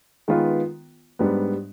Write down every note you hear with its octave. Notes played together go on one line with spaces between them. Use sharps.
D#3 G#3 B3 F4 B4
G#2 G3 B3 D4